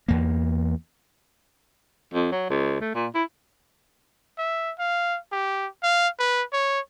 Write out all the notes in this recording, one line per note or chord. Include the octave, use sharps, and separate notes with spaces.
E2 A#3
F2
F#3
C#2
A3
A#2
E4
E5
F5
G4
F5
B4
C#5